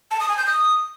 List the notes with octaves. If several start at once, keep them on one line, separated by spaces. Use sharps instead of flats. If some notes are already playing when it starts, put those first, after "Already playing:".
A5
D#6
G#5
G6
D#6